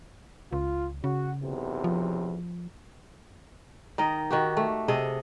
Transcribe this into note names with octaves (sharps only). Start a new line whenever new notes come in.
C#2 F4
C#3 F#4
B1 E2 C3
F3
D#3 A#4 D#5
D#3 F#4 G4
A3
C3 G#4 A4 D#5